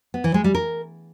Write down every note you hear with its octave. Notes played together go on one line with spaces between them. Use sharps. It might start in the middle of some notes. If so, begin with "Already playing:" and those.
B3
E3
G#3
G3
A#4